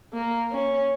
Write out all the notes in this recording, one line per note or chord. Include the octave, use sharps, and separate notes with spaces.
A#3
C#4